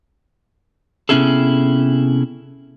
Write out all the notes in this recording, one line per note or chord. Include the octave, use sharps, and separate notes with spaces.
C3 B3 C#4 E4 G#4 A4